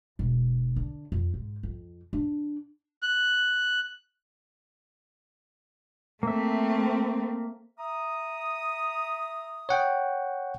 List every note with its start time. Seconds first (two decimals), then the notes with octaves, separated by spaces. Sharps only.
0.19 E1
0.76 D3
1.12 F2
1.34 G#2
1.63 F2
2.13 D4
3.03 F#6
6.23 A3 A#3 C4 E5
7.78 E5 A#5 D#6
9.69 C#5 F#5 G5